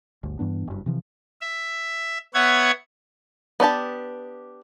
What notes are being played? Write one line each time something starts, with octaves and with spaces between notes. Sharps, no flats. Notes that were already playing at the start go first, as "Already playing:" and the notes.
G1 D2
G2 E3 B3 D4
F#1 G2
C3 E3 F3
E5
B3 C#5 E5 F#5 G#6
B3 D4 G4 A5